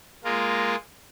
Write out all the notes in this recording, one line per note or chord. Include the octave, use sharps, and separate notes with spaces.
G#3 A#3 F4